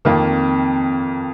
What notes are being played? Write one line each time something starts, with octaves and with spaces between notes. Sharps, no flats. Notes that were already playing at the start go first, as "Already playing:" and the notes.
F2 D#3 A#3